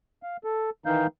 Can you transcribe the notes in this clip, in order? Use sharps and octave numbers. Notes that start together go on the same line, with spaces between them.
F5
A4
D#3 E3 D#4 F5 G6